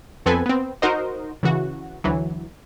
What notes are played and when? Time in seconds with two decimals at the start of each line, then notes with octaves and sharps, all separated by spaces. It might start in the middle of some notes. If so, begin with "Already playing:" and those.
0.26 F2 B3 C4 A4 B4 G#5
0.46 B3 C4
0.82 D#4 F#4 A#4 C5 D#5
1.43 C#3 E3 F#4
2.04 D2 E3 F#3